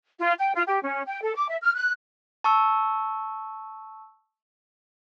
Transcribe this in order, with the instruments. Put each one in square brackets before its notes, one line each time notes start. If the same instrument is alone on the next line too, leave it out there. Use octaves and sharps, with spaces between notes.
[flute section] F4
G5
F4
G4
C#4
G5
A4
D6
E5
F6
F#6
[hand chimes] A5 C#6 E6